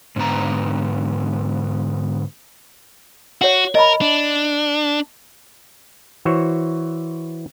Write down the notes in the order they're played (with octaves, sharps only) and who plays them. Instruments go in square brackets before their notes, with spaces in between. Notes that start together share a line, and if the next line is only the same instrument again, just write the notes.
[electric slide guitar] G#2 D3 B3 A#5
[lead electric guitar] F#4 [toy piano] C#5 F#5
[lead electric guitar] A#4 [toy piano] D#5 A#5 B5
[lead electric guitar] D4
[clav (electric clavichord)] E3 F#4 C5 C#5